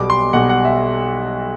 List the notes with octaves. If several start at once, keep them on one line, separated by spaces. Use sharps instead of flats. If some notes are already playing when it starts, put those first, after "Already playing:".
Already playing: B1 B2 G3 B3 D6
C6
B1 B2 G3 B3 F#5
F#5
E5